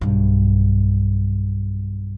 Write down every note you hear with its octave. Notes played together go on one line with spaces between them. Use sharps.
B1 G2